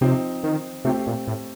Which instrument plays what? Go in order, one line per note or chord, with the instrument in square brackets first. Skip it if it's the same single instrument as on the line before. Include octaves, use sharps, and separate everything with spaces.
[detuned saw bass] C3 [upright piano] F3 C4 D#4
[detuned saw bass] D#3
[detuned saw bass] C3 [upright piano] A3 C4 G4
[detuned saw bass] A#2
A2